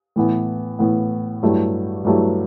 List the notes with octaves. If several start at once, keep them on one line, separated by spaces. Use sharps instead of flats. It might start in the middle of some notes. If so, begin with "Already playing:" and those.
A2 E3 B3
A2 E3 B3
G2 F#3 A3 E4 G4
G2 F#3 A3 E4 G4